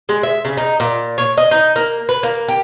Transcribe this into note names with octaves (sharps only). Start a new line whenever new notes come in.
G#3
E5
C#3
D#4
A#2
C#5
D#5
D#4
A#3
B4
A#3
G4